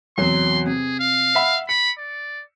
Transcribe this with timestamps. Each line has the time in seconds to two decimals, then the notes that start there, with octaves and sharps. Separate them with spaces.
0.18 E2 C3 F#3 C6
0.66 C3 G#4
1.00 F5
1.35 E5 F#5 B5
1.69 B5 C#7
1.98 D5